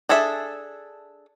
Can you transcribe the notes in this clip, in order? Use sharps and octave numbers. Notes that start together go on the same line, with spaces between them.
D4 G#4 A4 E5